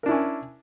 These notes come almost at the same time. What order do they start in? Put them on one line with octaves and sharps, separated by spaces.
A#4 D4 E4 C#4